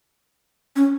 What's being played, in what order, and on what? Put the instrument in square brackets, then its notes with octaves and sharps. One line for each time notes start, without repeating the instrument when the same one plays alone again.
[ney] C#4